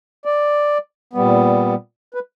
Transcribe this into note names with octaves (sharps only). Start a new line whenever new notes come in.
D5
A#2 G3 B3
B4